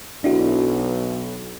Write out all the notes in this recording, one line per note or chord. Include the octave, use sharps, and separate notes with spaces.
B1 D4 E4 F#4